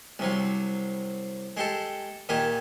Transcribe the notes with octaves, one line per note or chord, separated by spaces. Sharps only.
C2 C3 F#3
G#3 G4 A4
A#2 D#3 G4 G#5